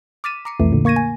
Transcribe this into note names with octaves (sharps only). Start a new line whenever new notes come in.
D6 F6 A6 B6 D#7 E7
A#5 D6 C7 C#7 D#7
C2 F2 E3 A3
A#2 D3
A#3 C#6 G#6 A#6 D#7
G#5